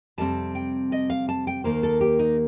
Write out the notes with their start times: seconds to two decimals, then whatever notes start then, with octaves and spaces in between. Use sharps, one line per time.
0.18 F2 C3 G3 C4 A5
0.55 G5
0.92 D#5
1.10 F5
1.29 A5
1.47 G5
1.64 D#2 D#3 A#3 C5
1.83 A4
2.01 G4
2.19 D#4